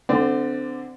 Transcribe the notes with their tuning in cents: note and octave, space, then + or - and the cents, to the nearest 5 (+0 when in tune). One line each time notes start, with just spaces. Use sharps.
D3 +0 C4 -25 D5 +15